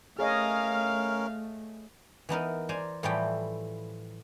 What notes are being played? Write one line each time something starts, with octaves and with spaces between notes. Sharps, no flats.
A3 C#4 G#4 A#4 C#5 D#5 F5 F6
E3 B3 D#4 A#4
C5 D5 G#5 A#5
A2 E3 F3 G3 E4 G5